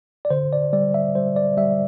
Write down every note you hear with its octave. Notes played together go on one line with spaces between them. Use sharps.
D5
D3 C5
D5
G3 D5
E5
G3 C5
D5
G3 E5